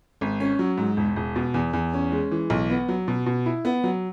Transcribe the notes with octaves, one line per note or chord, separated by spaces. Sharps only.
G#1
C#4
F#3
G#2
E1
E1
B2
E2
E2
C#4
G#3
E3
B1
B3
F#3
B2
B2
E4
B3
F#3